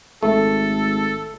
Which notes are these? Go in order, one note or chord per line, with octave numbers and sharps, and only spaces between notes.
G#1 A3 A4